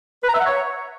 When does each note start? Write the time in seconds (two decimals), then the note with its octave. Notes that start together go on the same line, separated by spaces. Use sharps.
0.23 B4
0.29 A#5
0.35 E5
0.40 F#5
0.46 C#5